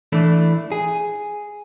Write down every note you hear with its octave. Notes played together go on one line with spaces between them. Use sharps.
E3 A3 D4 E4
G#4